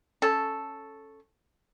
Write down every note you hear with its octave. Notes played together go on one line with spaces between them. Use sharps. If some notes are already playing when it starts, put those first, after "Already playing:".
C#4 A4